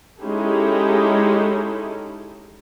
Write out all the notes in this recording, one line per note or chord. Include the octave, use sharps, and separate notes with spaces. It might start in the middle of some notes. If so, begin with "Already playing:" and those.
G#3 C#4 D#4 E4 G4 A4